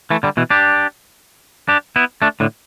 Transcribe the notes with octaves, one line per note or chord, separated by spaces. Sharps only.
E3 A3
D3 G3
B2 E3
D4 G4
D4 G4
B3 E4
A3 D4
A2 D3